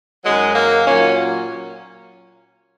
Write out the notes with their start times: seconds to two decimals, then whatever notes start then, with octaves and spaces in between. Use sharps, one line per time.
0.25 F#2 D#3 F#3 G#3
0.55 A#3
0.86 A#2 F#3 A#3 C#4